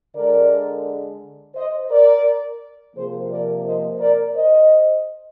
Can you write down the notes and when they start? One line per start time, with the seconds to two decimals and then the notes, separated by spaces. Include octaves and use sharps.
0.15 D3 G#3 A#4 D5
1.55 C5 D#5
1.90 A#4 D5
2.95 C3 F3 A#3 G#4 C5
3.29 A#4 D5
3.64 C5 D#5
3.99 A#4 D5
4.34 C5 D#5